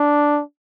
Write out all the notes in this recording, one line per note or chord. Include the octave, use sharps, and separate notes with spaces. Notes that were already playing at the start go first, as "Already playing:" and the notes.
Already playing: D4